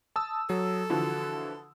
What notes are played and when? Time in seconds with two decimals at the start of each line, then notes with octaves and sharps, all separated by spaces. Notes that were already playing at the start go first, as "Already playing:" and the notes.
0.16 A5 D#6 E6
0.50 F#3 A4
0.90 D3 E3 F3 F#4